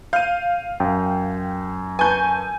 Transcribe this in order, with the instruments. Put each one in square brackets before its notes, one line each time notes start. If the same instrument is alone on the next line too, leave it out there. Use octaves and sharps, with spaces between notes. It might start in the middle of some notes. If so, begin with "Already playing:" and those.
[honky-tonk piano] F5 [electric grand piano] G6 D#7
[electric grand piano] F#2 [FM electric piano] G5
[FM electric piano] B4 A5 C#6 [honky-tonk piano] G#5 G6